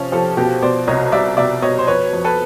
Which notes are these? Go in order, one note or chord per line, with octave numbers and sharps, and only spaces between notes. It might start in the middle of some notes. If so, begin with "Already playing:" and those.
Already playing: C3 F3 C#4
F3 G4 A4
B2 G4 A4
B2 C5 D5
C2 C#5 D#5
G3 D5 E5
B2 D5 E5
B2 C#5 D#5
C5
F2 B4 C#5
F2
A4 B4